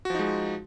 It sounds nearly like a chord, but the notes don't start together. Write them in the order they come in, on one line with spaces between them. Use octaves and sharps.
F#4 F3 D#4 G#3